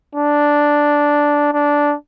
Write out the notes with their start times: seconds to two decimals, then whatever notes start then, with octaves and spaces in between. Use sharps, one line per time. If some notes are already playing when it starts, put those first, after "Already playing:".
0.15 D4
1.53 D4